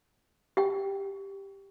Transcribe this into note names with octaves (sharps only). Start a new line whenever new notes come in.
G4 G5